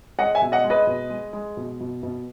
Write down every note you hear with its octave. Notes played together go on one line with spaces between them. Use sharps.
G#3 D#5 F#5
E5 G#5
B2
D#5 F#5
G#3
B4 D#5
B2
G#3
G#3
B2
B2
B2